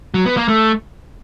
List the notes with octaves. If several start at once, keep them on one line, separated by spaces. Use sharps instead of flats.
F#3
B3
A#3
A3